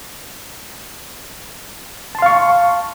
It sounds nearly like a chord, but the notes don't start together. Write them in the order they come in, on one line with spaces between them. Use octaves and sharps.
A5 C6 F5 C#6